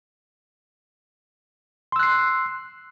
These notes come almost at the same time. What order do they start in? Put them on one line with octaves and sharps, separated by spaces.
C6 E6 F#6 C7